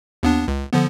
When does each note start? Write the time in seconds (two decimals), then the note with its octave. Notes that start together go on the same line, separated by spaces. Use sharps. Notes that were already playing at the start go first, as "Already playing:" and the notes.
0.23 D#2 B3 D4
0.48 C#2
0.73 D3 F3 B3